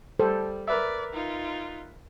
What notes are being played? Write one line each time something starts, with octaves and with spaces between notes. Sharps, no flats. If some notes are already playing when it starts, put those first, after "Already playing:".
G3 A4 C5
A#4 B4 D5 E5
D#4 F4